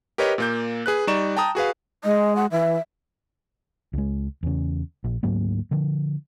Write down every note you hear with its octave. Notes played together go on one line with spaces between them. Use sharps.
G4 A#4 B4 C#5 D#5
A#2 A#3 G6
G#4 B4 F#6
G3 D#4 D5 A#5 C#6 E7
G5 A5 A#5 D#6
F#4 G#4 B4 F5
G#3 D#5
F#5
E3 E5
C#2 G#3
E2 C#3
A#1
D2 G#2 F#3 A#3
D3 F3